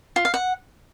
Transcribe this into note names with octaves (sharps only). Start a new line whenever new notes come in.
F4
F5
F#5